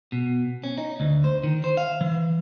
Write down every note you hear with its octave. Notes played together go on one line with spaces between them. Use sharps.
B2
C#4
D#4
D2
C5
D#3
C5
F5
E3